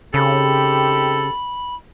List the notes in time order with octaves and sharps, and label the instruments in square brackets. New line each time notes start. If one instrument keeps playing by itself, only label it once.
[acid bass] C#3 [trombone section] C4 D#4 G4 [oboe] A4 [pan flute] B5